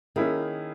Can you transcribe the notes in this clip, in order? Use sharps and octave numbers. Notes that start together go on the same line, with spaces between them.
D#3 A#3 C#4 E4 G#4